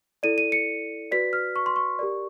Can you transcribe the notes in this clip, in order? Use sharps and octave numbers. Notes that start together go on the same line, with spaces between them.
E4 A4 D5 D#7
D#7
C#7
F#4 B4 D5 B6
F6
C#6
C6
C#6
G4 A#4 D5